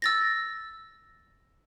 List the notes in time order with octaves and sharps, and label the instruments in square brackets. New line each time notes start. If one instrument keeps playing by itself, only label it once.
[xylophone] E6 A6 A#6